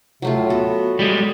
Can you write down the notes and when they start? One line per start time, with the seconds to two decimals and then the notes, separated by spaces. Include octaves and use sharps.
0.22 C3 F#3 A3 F4
0.35 D#2 A2
0.50 B3 F#4 A4
0.99 G3 G#3